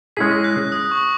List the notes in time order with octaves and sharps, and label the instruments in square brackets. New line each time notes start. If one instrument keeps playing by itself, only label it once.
[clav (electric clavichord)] G#3 C#4 E4 G#4 [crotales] B6
[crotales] A#6
F#6
F#6
D#6
C#6